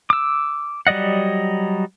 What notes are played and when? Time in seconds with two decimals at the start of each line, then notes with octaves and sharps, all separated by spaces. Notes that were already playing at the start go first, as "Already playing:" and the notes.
0.10 D6 E6
0.87 F#3 G3 D5 D#5 F#5